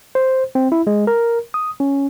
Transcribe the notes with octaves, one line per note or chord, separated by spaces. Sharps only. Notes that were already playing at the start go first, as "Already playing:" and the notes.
C5
C4
E4
G#3
A#4
D#6
C#4